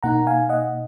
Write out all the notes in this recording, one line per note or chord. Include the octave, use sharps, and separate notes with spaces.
B2 A#3 D#4 F#5 A#5
F5 G#5
D#5 F#5